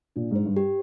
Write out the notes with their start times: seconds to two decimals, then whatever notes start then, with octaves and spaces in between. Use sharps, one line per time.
0.16 A#2 D4
0.31 G#2 C5
0.45 G2
0.56 G4